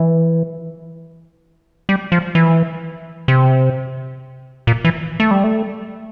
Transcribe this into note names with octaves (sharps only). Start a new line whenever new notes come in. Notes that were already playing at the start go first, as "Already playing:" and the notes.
Already playing: E3
G3
F3
E3
C3
A#2
E3
A3
G3
A3